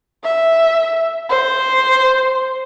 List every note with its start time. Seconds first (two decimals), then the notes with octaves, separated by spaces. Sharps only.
0.24 E5
1.30 C5